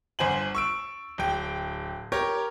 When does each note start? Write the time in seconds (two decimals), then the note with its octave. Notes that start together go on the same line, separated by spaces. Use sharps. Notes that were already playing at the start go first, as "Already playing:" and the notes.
0.19 G1 C5 G#5 F#7
0.55 C#6 E6 D7
1.18 D1 G5
2.12 G4 A#4 C#5